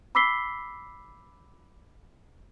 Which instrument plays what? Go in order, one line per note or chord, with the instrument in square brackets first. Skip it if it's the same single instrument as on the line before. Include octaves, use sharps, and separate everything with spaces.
[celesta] B5 D6 E6 B6 C7 G7